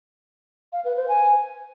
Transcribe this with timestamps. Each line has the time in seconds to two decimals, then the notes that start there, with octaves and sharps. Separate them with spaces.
0.73 F5
0.85 B4
0.97 C5
1.08 G#5